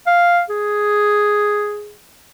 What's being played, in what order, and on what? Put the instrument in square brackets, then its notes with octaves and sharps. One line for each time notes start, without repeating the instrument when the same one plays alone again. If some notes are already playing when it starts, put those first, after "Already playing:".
[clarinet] F5
G#4